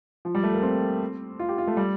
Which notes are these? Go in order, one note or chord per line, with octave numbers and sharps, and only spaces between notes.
F3
G3
A3
A#3
C4
F4
G4
F4
A3
G3